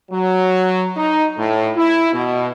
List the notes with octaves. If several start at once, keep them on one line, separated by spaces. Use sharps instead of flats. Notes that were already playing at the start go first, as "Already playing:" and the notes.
F#3
D#4
A2
E4
B2